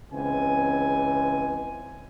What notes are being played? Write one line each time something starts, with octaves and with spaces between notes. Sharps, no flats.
C#2 C#3 E3 C4 G#5